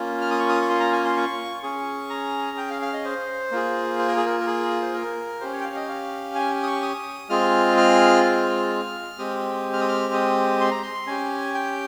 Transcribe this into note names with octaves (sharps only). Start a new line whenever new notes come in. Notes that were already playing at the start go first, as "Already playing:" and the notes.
Already playing: A#3 C#4 F4
F6
D#6
C#6
D#6
C#6
C6
A#5
G#5
C6
C#6
C#4 G#4 C#6
A#5
G5
F5
F5
D#5
C5
A#3 F4 G#4
C5
A#4
G#4
A#4
A#4
G#4
C5
A#4
C#4 G4 C5
C#5
G5
F5
D#5
F5
G#5
D#6
C#6
D#6
G#3 C4 F4 G#4 F6
F6
F6
G#3 C4 G4 D#6
F6
D#6
F6
D#6
C6
A#5
C6
C#4 G4 G#5
G5